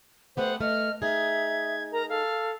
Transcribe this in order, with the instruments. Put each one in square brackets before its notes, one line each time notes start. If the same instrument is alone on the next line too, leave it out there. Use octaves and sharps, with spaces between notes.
[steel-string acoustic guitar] A3 B3 G4 [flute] C5 [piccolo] F#5
[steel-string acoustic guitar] A3 [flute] D#5 [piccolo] F6
[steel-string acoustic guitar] D#4 G#4 [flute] E5 [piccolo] G#6
[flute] A#4 [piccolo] A#5
[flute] A4 [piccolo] F5